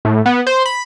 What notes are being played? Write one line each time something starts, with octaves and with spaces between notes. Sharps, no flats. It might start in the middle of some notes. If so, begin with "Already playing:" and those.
A2
B3
C5
B5